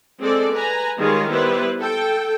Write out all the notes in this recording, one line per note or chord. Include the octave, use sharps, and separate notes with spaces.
G#3 C4 A4 D5
B4 G#5 A#5
D#3 G3 G#3 F4 G#4 C#5
G3 B3 E4 B4 C5
A4 G5